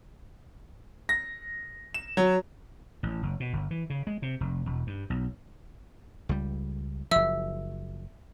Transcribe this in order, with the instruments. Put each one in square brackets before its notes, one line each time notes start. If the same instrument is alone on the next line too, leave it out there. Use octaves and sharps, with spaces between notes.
[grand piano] A#6
E7
F#3
[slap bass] A1
F#1
B2
G1
E3
C#3
G#3
C3
F1
E1
G2
B1
C#2 G3
[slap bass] F#1 F3 [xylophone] E5 E6